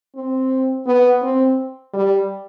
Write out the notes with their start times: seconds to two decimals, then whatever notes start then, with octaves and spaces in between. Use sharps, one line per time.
0.15 C4
0.87 B3
1.22 C4
1.94 G3